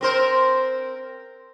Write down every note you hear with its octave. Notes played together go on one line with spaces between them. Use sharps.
C4 A#4 C5